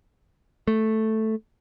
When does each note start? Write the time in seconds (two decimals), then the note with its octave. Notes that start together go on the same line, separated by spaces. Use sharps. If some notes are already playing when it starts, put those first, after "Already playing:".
0.68 A3